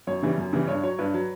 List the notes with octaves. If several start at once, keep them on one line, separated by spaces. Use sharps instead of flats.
F#2 C#5
C#3 E3 G3
F#2
C#3 E3 G3
G2 C#5
F#3 C#5
G2 B4
F#3